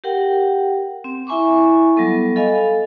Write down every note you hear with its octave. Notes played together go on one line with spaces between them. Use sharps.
G4 A#4 F#5 G5
C4
E4 E5 G#5 B5 C#6 D6
F#3 G3 B3 A4
A4 D#5 F5 G#5 B5
A4